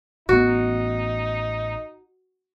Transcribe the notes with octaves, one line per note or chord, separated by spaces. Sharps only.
A1 B3 D#4 F#4